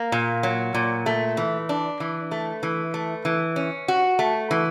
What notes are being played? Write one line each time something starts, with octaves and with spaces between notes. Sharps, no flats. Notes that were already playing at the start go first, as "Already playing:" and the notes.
Already playing: A#3
A#2
F#3
A#2
A3
E3
D4
E3
A3
E3
A3
E3
C#4
F#4
A3
E3